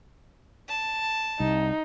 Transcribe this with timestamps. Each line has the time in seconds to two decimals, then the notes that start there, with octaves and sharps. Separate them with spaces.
0.69 A5
1.40 C2 D#4